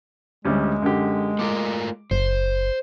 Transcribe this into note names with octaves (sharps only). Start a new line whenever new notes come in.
D2 G3 G#3 C#4
F#2 D3 G4
A3 F4 A#4 D6
F#1 C5